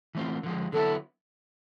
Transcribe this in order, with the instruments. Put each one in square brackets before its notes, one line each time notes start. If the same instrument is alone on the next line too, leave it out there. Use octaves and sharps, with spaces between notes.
[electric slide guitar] E3 A3 C4 F4
D3 F3 G#3
[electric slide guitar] D3 F#3 B3 E4 [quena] A4